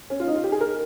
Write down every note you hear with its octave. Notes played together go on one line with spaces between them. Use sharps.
C#4
F4
D#4
F4
G4
G#4
A#4